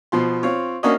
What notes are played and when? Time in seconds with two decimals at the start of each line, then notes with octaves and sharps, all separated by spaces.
0.12 B2 F3 C6
0.43 C4 F4 C#5
0.83 A#3 C#4 D4 F#4 C#5 D#5